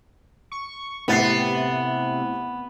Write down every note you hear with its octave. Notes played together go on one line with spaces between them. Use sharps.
C#6
A2 C3 B3 A6 C7